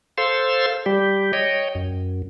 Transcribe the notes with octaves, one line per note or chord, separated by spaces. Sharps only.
A4 C5 F5 C6 E6
G3 G4
C#5 D#5 G5
F#2